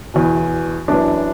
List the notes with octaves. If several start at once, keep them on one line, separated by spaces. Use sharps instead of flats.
E2 B2
F#2 E3 D4